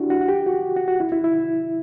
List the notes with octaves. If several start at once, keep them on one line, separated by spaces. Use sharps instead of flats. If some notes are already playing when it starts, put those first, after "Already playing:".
Already playing: D4 E4 F#4 G4
F#4
F#4
G4
F#4
F#4
F#4
E4
E4
E4